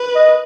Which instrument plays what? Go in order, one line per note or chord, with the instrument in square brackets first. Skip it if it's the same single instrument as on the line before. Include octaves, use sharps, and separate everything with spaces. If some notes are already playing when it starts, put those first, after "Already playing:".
Already playing: [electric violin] B4
[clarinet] D#5